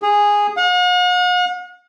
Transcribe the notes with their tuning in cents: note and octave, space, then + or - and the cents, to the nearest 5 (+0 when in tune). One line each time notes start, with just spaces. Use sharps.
G#4 -10
F#5 -45